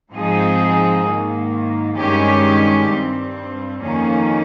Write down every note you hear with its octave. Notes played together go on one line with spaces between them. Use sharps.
G#2 F3 C4 D#4 G#4
G#2 D#3 A#3
G2 D#3 G#3 C#4 G4
G2 G3 C4
F2 D#3 A#3 C#4